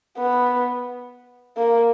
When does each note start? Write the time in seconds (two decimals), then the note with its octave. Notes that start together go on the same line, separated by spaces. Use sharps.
0.18 B3
1.58 A#3